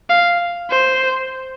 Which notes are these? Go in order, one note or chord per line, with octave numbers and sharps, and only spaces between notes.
F5
C5